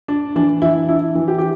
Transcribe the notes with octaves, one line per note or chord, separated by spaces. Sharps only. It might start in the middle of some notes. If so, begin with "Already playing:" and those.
D4
E3 D4
E3 E4
D4 E4
E3
G4
G4